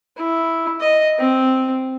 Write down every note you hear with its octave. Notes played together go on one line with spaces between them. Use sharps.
E4
D#5
C4